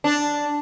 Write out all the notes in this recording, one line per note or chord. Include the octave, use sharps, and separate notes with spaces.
D4